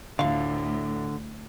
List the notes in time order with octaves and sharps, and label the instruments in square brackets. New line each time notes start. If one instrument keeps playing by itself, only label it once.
[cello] D2 A2 [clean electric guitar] D3 [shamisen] F4 F5